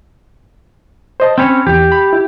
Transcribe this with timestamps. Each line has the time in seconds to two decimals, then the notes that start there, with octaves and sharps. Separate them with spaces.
1.20 C5 D#5 A5
1.38 C4 C#4 C#5 G5 B5
1.67 E2 G4
1.92 B5
2.13 E4